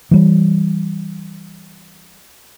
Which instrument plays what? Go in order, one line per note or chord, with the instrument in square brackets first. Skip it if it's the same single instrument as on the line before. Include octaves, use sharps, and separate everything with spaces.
[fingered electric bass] E3 G3